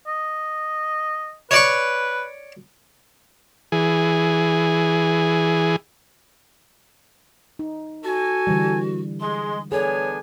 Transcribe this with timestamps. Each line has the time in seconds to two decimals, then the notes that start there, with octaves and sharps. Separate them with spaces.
0.07 D#5
1.51 B4 C#5 D5 C#6
3.72 E3 G#4
7.59 D#4
8.04 F#4 A4 G#5
8.47 D3 E3 G3
9.21 G#3 C6
9.72 B3 D4 G#4 A4 C#5 G#5